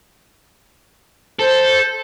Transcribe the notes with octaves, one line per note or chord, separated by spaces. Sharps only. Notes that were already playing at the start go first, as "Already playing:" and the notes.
A4 C5